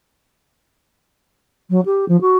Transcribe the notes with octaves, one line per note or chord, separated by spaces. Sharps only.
F#3
G4
F3
F#4